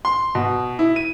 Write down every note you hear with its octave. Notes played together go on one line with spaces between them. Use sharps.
C6
B2
E4
D#7